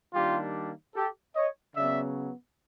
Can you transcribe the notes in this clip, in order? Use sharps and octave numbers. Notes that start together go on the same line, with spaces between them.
D#3 G3 A#3 D4 F4 G4
G4 A4
C#5 D#5
C#3 F#3 B3 D5 E5